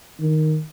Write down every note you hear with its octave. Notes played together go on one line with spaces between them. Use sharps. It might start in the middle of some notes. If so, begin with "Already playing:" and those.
D#3